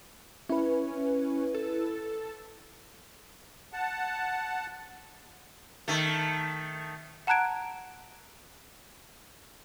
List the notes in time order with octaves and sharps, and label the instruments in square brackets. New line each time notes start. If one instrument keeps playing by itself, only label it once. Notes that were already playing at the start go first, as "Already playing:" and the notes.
[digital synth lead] C#4 [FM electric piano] E4 B4
[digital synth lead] A4
[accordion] F#5 A5
[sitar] D#3 A3
[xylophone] F#5 A5 A#5 F#6 G#6 D7